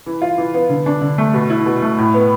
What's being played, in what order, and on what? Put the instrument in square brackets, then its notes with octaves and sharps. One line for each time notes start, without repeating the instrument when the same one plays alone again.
[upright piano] E3
F4
E3
B3
D3
D4
D3
A3
B2
E4
B2
A3
A2
B3